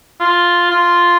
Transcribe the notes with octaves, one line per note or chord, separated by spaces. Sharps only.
F4
F4